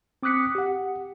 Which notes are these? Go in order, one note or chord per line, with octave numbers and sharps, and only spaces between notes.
C4 D6 D#6 F#6 B6 C#7
G4 F#5